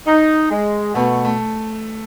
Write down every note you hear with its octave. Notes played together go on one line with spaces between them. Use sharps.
D#4
G#3
B2 A3
A3